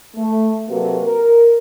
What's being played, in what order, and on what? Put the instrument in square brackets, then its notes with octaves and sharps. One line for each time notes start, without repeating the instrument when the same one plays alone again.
[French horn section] A3
C3 F#3 A#3 F#4 A4 B4
A#4